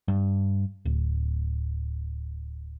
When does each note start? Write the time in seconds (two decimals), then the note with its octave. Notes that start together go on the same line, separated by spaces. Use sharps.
0.08 G2
0.85 D1